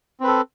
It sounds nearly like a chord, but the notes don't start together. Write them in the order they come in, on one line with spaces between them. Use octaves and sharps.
C4 B4 A4